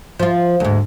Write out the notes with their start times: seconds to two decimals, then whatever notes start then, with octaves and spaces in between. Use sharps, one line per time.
0.20 F3 F4
0.60 D2 G#2